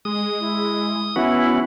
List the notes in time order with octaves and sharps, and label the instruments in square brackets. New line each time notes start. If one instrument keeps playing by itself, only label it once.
[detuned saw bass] G#3 [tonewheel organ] D#6
[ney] E4
[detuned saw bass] E3 [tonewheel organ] B3 C#4 F#4 [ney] E4